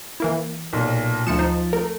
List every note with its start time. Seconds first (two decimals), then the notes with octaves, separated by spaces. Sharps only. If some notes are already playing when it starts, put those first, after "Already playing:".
0.20 E3 A#3 E4
0.73 B1 A#2
1.27 D2 F3 C#7 E7
1.39 D#4 C5
1.73 A3 A#4